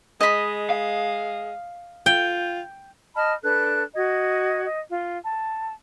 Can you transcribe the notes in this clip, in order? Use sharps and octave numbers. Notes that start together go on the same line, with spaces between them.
G#3 D#5 B5
F5
F4 G5
D#5 A5 B5 F6
D4 A4 B4 F#6
F#4 D#5 G#6
D#5
F4
A5